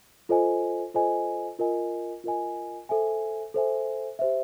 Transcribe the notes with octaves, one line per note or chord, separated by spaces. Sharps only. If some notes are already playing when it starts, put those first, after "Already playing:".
F4 A4 C5 D#5 G#5
F4 A4 C5 D#5 G#5
F4 A#4 D#5 G#5
F4 A#4 D#5 G#5
A4 C5 E5 G#5
A4 C5 E5 G#5
G4 C5 E5